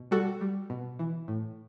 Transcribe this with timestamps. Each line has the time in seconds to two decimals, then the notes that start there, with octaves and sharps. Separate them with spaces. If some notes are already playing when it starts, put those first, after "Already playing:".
Already playing: B2
0.11 G3 F#4 A4
0.41 G3
0.70 B2
0.99 E3
1.28 A2